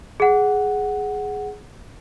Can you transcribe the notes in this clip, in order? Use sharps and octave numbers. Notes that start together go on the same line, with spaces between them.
G#4 F#5